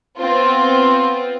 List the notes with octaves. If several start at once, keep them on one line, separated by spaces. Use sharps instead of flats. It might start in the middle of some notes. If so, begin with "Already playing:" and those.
B3 C4 F4